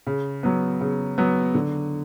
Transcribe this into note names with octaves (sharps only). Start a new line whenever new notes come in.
C#3
F#3 B3
C#3
F#3 B3
D3